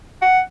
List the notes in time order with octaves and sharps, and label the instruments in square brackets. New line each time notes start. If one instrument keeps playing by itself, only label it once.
[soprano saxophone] F#5